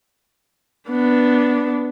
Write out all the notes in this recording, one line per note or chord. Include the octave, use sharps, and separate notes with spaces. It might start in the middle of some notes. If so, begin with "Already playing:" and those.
B3 D4